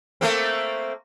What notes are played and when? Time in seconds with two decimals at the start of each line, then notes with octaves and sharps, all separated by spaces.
0.21 A3 A#3 C4